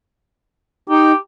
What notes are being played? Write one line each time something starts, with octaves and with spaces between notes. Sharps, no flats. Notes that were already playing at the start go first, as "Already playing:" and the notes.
D#4 G4